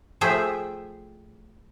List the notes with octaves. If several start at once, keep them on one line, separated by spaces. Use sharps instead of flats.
F3 A3 G#4 E5 G5